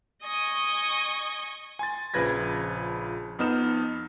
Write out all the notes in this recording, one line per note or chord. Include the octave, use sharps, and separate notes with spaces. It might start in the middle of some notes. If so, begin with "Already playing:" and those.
D#5 G#5 C#6
G#5 C6 A6
A#1 C#3 F3 B4 G#6 A#6
F2 B3 D#4 F6 E7